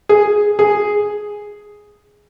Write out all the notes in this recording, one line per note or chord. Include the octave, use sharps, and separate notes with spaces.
G#4
G#4